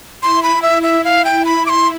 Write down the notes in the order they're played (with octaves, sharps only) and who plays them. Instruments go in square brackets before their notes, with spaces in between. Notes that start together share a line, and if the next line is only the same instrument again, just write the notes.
[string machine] E4 [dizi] C6
[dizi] B5
E5
E5
F5
G5
B5
D6
C6